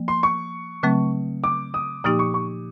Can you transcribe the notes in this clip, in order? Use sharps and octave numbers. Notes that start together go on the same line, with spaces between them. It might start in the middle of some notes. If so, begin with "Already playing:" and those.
Already playing: F3 A#3
C6
C#6
C#3 F#3 A3 C4
D6
D#6
A#2 F3 A#3 D#4 G4 D#6
C#6
C#6